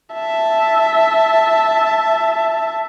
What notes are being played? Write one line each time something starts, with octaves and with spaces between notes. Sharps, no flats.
E5 A5